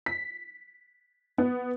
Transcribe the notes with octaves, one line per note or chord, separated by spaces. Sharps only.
B6
B3